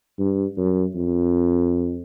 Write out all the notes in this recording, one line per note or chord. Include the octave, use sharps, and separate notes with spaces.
G2
F#2
F2